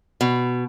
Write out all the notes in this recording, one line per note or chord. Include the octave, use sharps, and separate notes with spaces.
B2